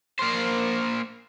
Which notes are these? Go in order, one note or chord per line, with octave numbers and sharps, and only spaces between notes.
A#3 C5